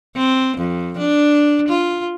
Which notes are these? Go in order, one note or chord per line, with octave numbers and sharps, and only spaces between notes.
C4
F2
D4
F4